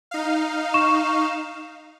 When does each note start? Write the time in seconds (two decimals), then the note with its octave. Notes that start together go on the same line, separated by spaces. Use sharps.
0.11 D#4 F5
0.74 C#6 E7